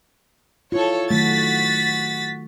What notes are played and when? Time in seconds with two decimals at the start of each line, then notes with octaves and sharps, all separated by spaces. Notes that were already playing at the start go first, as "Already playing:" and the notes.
0.72 E4 F4 A4 C#5
1.10 D#3 F#3 A3 F#4 A6 B6